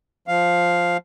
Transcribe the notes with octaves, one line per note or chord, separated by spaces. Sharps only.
F3 F5